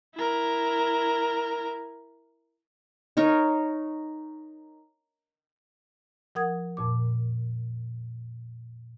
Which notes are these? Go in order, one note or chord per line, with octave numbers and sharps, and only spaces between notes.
E4 A#4
D#4 A#4 C#5
F3 A#4 F#5 D#6 G#6
F2 A#2 D6